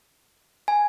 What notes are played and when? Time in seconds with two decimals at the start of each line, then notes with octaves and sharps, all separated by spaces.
0.68 G#5